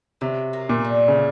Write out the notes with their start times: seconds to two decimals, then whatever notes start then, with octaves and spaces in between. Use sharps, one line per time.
0.21 C3 F#3
0.53 A#3
0.69 A#2
0.84 D3
1.08 C#3